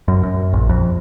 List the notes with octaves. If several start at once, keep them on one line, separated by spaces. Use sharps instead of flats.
F#2
F#2
A#1
F2